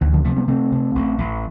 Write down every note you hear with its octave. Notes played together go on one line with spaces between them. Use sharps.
D2 E3
D3 F3
C3 F3 A3
G3 B3
C3 A3 C4
C3
A1
A1